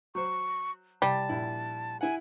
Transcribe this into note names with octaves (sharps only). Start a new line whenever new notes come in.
F#3 C5 C#6
C2 G3 A5
A#1 E4
E4 F#5 G#5